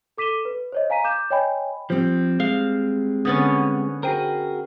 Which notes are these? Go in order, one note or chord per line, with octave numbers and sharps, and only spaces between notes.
A4 D6 B6 D#7 E7 G7
B4
C5 C#5 D#5
F5 G#5 A#5 B6 D#7
D6 G6 E7
C#5 D#5 G5 G#5 B5
F3 G3 C4 C5
G#3 F5
D3 B3 C#4 D#6 A6
F#4 G#4 A#4 C5 G5 D#7